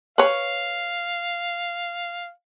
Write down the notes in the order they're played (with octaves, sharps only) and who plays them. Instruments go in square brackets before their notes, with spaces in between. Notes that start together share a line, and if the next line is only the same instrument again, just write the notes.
[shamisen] B4 C#5 [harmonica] F5